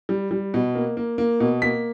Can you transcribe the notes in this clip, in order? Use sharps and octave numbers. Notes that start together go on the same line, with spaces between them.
G3
G3
B2
A#3
A#3
A#3
B2
A#3 B6